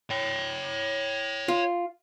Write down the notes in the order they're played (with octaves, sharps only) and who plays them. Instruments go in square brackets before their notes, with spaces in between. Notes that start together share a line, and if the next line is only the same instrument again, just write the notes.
[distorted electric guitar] C#5 G5
[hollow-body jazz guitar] F4